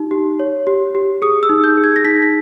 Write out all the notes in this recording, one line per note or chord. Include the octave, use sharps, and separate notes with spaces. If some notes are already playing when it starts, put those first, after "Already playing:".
Already playing: D#4 G4
G4
C#5
G4
G4
G#4 D#6
E6
D#4
G6
G#4
G#6
A#6
D#4 B6
B6